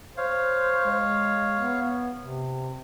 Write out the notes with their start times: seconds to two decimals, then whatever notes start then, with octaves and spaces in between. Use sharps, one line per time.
0.17 C5 C#5 F5
0.86 G#3
1.59 B3
2.20 C3